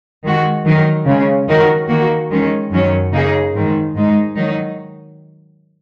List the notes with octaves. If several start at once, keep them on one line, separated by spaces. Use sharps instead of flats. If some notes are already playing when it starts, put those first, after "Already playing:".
D#3 G#3 F#4
D#3 F#3 D#4 A#4
C#3 G#3 C#4
D#3 F#3 D#4 F#4 A#4
D#3 A#3 F#4
D#3 G#3 C#4
F#2 D#3 F#3 C#4
C#3 A#3 D#4 G#4
G#2 D#3 G#3
G#2 G#3 D#4
D#3 F#3 D#4